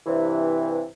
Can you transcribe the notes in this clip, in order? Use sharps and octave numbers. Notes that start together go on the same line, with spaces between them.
G2 C3 E3